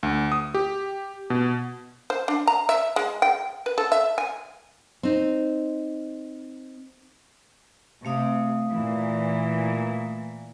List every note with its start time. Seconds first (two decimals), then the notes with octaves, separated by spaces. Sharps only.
0.03 D2
0.32 D#6
0.54 G4
1.30 B2
2.10 C5
2.28 D4
2.47 A#5
2.69 E5
2.96 G#3
3.22 G5
3.66 B4
3.78 A4
3.92 E5
4.18 G#5
5.03 C4 D#4
8.05 C3 A3 F5 D#6
8.71 A#2 E3